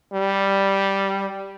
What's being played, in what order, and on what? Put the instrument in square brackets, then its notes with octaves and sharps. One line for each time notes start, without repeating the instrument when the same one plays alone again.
[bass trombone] G3